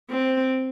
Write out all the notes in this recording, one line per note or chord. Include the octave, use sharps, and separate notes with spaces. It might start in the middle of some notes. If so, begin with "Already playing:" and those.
C4